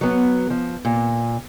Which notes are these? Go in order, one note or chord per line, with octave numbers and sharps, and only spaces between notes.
F#3 B3
F3
A#2